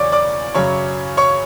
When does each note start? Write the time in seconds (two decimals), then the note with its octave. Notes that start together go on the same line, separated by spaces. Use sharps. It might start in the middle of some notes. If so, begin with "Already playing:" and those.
Already playing: E2 C#3 F#3 C#5 D5 C#6 D6
0.12 D5 D6
0.55 F#2 C#3 F#3 C#5 C#6
1.17 C#5 C#6